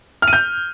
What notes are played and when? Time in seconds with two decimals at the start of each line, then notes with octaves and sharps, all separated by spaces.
0.22 F6
0.28 D#7
0.33 G6